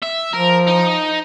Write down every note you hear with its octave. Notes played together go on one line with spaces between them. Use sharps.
E5
F3 A#4
D#4